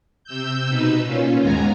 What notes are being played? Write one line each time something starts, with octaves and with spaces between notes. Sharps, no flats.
C3 E6 G6
B2 D#4 B4 E6
A#2 C#4 F4
D#2 G#2 G#3 B3 G#5 A#5